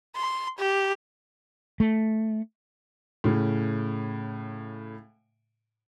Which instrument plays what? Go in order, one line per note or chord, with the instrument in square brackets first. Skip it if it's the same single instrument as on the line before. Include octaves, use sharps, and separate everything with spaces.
[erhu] C6
G4
[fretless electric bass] A3
[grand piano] A2 C#3